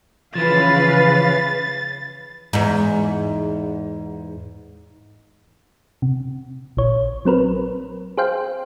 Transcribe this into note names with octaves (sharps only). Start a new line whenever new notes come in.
C#3 E3 F3 B4 F5 A6
E2 G#2
C3
A#1 C#5
F#3 C4 A#4 B4
G#4 C5 F5 G5